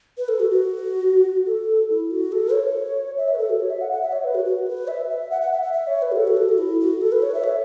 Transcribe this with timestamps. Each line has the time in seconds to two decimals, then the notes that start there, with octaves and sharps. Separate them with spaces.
0.18 B4
0.28 A4
0.40 F#4
0.51 F#4
1.46 A4
1.89 E4
2.11 F#4
2.32 A4
2.53 C#5
3.17 E5
3.28 C#5
3.33 B4
3.38 A4
3.49 F#4
3.60 C#5
3.70 E5
3.81 F#5
3.92 F#5
4.02 E5
4.12 C#5
4.24 B4
4.35 F#4
4.45 F#4
4.67 B4
4.88 E5
5.09 E5
5.31 F#5
5.41 F#5
5.52 E5
5.62 E5
5.73 E5
5.87 C#5
6.02 B4
6.12 F#4
6.16 A4
6.27 F#4
6.37 A4
6.49 F#4
6.58 E4
6.80 F#4
7.01 A4
7.12 B4
7.22 C#5
7.34 E5
7.44 C#5